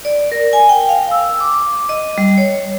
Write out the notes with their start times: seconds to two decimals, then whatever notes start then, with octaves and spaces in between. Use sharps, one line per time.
0.05 D5
0.32 A#4
0.53 G#5
0.69 G5
0.89 F5
1.11 E6
1.40 D6
1.89 D#5
2.18 G3
2.37 C#5